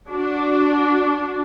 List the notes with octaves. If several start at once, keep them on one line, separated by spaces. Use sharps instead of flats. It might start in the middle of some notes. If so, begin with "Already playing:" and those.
D4 F#4